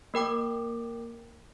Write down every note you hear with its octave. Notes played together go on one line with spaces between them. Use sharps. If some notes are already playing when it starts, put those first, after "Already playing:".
A#3 A#4 G5 D6